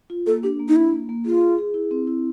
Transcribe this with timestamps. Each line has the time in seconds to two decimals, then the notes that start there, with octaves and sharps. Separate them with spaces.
0.10 F4
0.26 A#3 A4
0.43 D4 G4
0.60 A#3
0.69 D#4
0.76 D4 E4
0.92 A#3
1.09 A#3
1.25 F4 G#4
1.41 G#4
1.58 G#4
1.74 E4
1.91 C4
2.07 E4